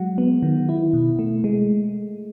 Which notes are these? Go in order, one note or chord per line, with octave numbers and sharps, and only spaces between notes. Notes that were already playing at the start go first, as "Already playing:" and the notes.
Already playing: F#3 G#3 F#5
B3
D#3
E4
B2
A3
G#3